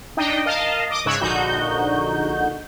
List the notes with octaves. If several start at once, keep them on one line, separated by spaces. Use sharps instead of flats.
D4 D#4 D#5 G5
A#4 D#5 F5 A5
D#5 D6 D#6
G#2 C#3 C#5 E6 F#6 G#6
A#1 D3 D#4 F#4 G6